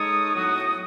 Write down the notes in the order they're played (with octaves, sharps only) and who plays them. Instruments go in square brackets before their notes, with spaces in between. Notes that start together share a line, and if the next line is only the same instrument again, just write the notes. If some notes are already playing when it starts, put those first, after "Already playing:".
Already playing: [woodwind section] G#3 D#4 A4 C#5 [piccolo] D#6
[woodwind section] A2 F#3 B3 D#4 F#4